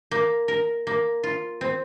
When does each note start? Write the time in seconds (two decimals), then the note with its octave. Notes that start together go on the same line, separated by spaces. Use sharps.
0.11 A#3
0.48 A#4
0.87 A#3
1.23 F4
1.61 C4